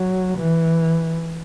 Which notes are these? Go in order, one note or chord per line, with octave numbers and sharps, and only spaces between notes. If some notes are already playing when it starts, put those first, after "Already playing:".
Already playing: F#3
E3